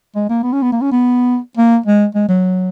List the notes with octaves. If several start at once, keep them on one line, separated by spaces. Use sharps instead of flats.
G#3
A#3
B3
C#4
B3
A#3
C#4
B3
A#3
G#3
G#3
F#3